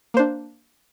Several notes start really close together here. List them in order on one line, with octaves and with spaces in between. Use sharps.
A#3 C5 D4